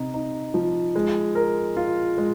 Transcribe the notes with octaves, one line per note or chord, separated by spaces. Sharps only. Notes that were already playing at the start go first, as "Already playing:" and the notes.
Already playing: C3 D#4
D#4
F3
G#3
A#4
F4
G#3